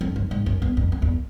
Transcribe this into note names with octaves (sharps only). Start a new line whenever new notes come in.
F2
F#2
G#2
F#2
E2
F2
F2
E2